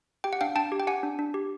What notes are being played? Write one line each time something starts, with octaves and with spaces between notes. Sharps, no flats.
G4 G5
F#5
D4 F5 G5
D4 G5 A5
G4
G5
G4 F#5 G#5
D4
D4
G4